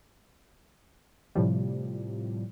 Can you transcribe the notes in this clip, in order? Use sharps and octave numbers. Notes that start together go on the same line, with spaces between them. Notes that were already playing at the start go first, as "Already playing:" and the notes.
A2 C3 F3 G3